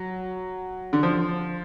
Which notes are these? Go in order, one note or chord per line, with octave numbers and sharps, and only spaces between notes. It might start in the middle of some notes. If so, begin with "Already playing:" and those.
Already playing: F#3
D3
F3